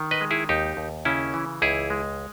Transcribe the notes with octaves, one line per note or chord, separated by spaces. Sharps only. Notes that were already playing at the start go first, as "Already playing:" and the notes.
Already playing: D#3
B4 D#5
G#3
E4 G#4
D#2 D#4 G4
D#2
C#3 C#4 E4
E3
C#2 E4 G#4
G#3